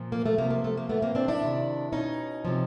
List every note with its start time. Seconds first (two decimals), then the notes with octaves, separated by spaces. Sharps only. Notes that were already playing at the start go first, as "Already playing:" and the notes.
Already playing: A#2 F3
0.12 A#3
0.26 A3
0.38 C3 F3 A#3
0.50 A#3
0.64 A3
0.77 A#3
0.89 A2 E3 A3 B3
1.02 A#3 C4
1.15 C4 D4
1.28 D4 E4
1.41 C3 D#3
1.92 B2 C#4 D#4
2.45 C3 F3